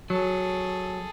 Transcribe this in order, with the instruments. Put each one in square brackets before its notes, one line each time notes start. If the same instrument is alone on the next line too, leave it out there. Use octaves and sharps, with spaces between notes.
[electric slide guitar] F#3 [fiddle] G#4 A4